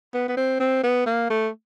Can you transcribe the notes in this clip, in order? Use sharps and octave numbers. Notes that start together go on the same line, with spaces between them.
B3
B3
C4
C4
B3
A#3
A3